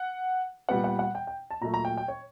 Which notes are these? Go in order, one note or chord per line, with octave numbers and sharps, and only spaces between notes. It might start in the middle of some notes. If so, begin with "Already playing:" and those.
Already playing: F#5
A#2 G3 B3 F#5
F#5
F#5
G5
G5
A5
A#2 F#3 A3 A#5
A#5
G5
G5
C#5